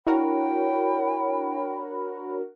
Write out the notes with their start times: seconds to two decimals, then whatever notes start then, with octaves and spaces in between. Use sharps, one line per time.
0.07 D4 E4 F#4 A#4 C#5 G5 B5